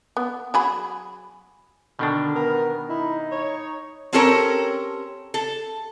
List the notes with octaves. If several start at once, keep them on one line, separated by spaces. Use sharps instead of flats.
B3
F#3 G#4 B5
B2 D3 D#3 D4 A4
B3 A#4
D#4 E4
C#5
C4 C#4 G4 A4 A#4 C#5
A4